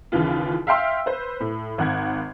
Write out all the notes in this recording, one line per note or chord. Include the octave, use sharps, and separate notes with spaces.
D#2 C#3 E3 F4
E5 F5 G5 C6 E6
B4 C5
A2
G#1 F#5 G#6